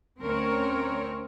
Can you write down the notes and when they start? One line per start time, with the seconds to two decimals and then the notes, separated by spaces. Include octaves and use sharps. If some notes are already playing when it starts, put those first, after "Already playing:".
0.20 D2 C4 C#4 A#4 C#5